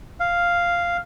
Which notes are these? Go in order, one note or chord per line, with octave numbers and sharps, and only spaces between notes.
F5